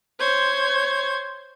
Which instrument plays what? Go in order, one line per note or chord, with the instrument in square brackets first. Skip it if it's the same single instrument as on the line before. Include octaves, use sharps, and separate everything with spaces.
[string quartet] C5 C#5 G#6